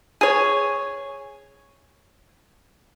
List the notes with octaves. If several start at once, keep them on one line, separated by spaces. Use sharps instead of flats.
G#4 C#5